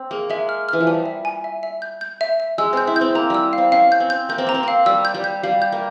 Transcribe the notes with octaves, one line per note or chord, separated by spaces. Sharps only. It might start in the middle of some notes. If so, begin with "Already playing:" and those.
Already playing: C4
A#3 G#4
G#3 E5
F6
E3 F6
F3
G3 G#5
E5
G#5
E5
E5
G6
G6
E5
E5
G#3 E6
C4 G6
E4
G6
C4
A#3 A#5
G3 E6
C4 F5
C#4 F5
G6
C4
G6
A#3 G6
C4
A#3 A#5
C4
A#3 F5
G3 E6
G6
G3
G6
G3 F5
G6
A#3